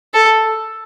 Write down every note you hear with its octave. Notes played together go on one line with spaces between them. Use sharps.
A4